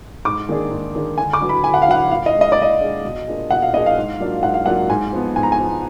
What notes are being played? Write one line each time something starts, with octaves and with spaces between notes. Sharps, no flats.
G#2 D6
D#3 A#3 D4 G#4
G#2
D#3 A#3 D4 G#4
D3 G#5
D6
F#3 D4 F#4 B4
B5
D3 G#5
F#5
F5
F#3 D4 F#4 B4 F#5
A#2 F5
D#5
G#3 D4 G#4
D#5
D5
A#2 D#5
G#3 D4 G#4
B2
A#3 D4 F4 G#4
B2 F#5
F5
A#3 D4 F4 G#4 D#5
F5
G#2
F#3 A#3 D4 F4
G#2 F#5
F5
F#3 A#3 D4 F4 F#5
G#2 G#5
F3 B3
G#2 G#5
A#5
G#5
F3 B3